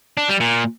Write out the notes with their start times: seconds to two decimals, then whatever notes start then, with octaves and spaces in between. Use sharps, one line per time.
0.17 D4
0.29 G3
0.40 A#2